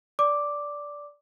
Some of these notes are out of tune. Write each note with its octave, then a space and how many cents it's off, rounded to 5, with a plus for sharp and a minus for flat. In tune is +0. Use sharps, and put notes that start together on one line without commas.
D5 -10 D6 +0